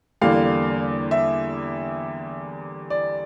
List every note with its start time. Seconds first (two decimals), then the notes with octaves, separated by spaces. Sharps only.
0.21 E2 D3 G3 A#3 F5
1.11 E5
2.90 D5